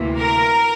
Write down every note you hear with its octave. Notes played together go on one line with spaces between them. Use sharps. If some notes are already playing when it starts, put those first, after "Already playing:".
Already playing: D2 C3 E3 A#3
A#4